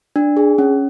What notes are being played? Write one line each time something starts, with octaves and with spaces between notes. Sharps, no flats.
D4
G#4
C#4